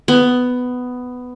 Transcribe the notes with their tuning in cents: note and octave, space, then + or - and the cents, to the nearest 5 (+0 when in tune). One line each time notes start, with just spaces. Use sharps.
B3 +10